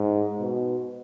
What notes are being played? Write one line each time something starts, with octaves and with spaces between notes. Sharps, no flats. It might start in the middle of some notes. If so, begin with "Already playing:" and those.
Already playing: G#2
B2